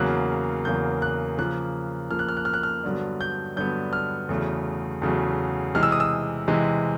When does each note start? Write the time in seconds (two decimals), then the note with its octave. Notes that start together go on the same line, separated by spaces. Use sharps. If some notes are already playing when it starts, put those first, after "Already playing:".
Already playing: E2 C#3 F#3 A#3 F#6
0.65 E2 C#3 F#3 A#3 G6
1.02 F#6
1.38 C#3 F3 A#3 F#6
2.11 C#3 F3 A#3 F6
2.19 F#6
2.28 F6
2.37 F#6
2.45 F6
2.54 F#6
2.63 F6
2.84 G2 D3 F#3 B3
3.21 G6
3.56 G2 D3 F#3 B3 G6
3.93 F6
4.29 E2 C#3 F#3 A3
5.02 E2 C#3 F#3 A3
5.74 C3 E3 G#3 F6
5.83 E6
5.92 D#6
6.00 E6
6.48 C3 E3 G#3